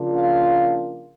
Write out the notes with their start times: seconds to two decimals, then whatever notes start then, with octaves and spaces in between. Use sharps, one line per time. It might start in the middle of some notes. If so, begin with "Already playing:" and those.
Already playing: C#3 F3 A#3 D4 F4
0.15 F5